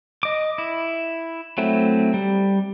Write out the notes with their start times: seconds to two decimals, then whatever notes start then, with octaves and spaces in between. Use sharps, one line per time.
0.23 D#5 D6
0.58 E4
1.58 F#3 A3 C4 E4
2.14 G3